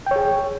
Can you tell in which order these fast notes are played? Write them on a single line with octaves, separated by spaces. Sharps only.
G5 C#5 G#4